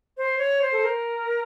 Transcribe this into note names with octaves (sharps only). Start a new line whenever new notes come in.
C5
C#5
C5
A4
A#4